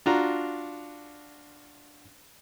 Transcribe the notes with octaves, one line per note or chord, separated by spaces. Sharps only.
D4 F4 F#4 A#5